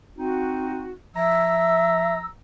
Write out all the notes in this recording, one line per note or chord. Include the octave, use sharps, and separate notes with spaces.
C4 D#4 F#4
F3 E5 A#5 E6